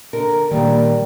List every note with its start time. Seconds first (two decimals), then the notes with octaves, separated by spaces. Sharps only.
0.13 D3 A#4
0.51 A#2 D#3 G3 A#3 D4